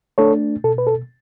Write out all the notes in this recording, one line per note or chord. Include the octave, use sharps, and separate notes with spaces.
A3 D4 A4 C#5
B2 A4
B4
A4